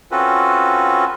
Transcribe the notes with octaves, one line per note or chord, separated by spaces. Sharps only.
C4 C#4 F4 F#4 A4 B4